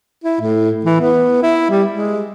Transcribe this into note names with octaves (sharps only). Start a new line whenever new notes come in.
E4
A2
E3
B3
E4
G3
G#3